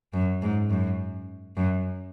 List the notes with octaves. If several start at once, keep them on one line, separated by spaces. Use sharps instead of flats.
F#2
G#2
F#2
F#2